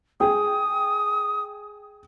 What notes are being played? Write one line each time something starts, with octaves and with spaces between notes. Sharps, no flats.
G#4 G5 D#6